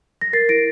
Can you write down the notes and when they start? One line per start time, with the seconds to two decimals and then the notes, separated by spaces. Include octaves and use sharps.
0.21 A#6
0.33 A#4 A6 C7
0.49 E4 A#6 D7